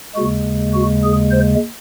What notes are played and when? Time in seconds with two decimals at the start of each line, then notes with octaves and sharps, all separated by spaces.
0.15 D#2 C#3 G#3 F#4
0.74 F#4
1.03 G#4
1.31 C5